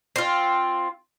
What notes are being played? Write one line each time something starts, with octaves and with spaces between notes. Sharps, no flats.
C4 F4